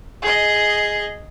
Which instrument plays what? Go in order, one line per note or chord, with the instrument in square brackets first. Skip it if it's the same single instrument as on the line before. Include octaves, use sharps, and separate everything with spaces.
[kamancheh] G#4 D#5